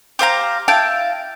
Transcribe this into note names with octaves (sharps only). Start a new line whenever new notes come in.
G4 C5 F5 A#5
E4 F5 G5 A5